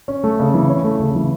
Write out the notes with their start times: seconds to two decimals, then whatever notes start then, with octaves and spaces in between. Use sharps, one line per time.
0.08 C#4
0.24 A3
0.39 C#3
0.54 E3
0.69 C#4
0.84 A3
1.00 C#3
1.15 E3